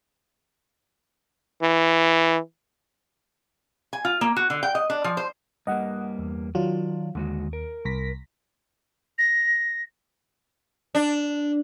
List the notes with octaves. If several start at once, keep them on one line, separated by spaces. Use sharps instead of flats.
E3
G#5
F4
A#3
F#4
D3
G5
D#5
D4
F3
C5
G2 G3 A#3 D#5 F#5
E2
D#3 F#3 F4 D5
D#2 D3 G#3 F#4
A#4
C2 A#6 B6
A#6
D4